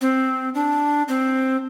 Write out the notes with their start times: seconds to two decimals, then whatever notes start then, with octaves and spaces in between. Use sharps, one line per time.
0.01 C4
0.55 D4
1.08 C4